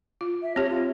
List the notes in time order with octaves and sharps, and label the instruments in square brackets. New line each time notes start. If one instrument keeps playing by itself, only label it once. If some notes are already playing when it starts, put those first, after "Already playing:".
[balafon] F4
[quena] E5
[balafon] C4 G4 [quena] C#5
[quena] F4